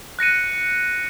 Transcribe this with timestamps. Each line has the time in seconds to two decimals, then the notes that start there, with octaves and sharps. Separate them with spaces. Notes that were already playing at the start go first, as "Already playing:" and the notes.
0.19 F#6 A#6 C#7 D#7